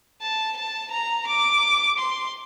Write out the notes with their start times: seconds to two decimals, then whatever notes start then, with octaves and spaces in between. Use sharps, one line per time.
0.22 A5
0.56 A5
0.91 A#5
1.27 D6
1.98 C6